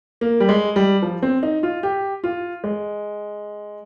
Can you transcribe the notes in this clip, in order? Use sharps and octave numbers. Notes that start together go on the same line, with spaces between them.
A#3
G3
G#3
G3
F3
C4
D#4
F4
G4
F4
G#3